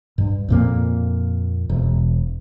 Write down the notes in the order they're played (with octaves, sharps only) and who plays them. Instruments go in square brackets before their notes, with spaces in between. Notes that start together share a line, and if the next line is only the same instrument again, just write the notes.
[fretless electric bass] G2
F2 A#2 A#3
E1